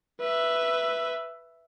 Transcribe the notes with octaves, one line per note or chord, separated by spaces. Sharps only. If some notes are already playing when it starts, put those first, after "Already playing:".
B4 E5